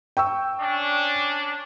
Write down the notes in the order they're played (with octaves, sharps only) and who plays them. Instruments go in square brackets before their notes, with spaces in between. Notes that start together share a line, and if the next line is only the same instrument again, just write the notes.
[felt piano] G5 C#6 E6
[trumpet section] C#4 D4